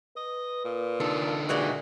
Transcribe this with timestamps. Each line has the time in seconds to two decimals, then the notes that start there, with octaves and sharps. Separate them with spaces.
0.17 B4 D#5
0.64 A#2
1.00 D3 D#4 A4
1.49 A#2 E3 G#3 F#4